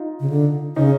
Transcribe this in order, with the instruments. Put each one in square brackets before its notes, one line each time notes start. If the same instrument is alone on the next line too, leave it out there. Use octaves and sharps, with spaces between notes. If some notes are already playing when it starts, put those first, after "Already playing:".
Already playing: [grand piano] D#4 F4
[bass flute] C#3
D3
[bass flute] C#3 [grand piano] C#4 D#4